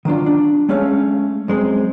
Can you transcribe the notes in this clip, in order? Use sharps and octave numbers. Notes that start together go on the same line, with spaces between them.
D#3 F#3 D4 F4
D4
G#3 A3 C#4 C#5 F5
F#2 G#3 C4